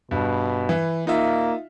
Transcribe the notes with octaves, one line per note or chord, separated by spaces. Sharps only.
G2 B2
E3
A#3 D#4 F4 E5